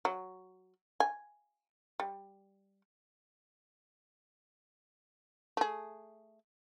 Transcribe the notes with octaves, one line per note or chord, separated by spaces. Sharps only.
F#3
G#5
G3
A3 G#4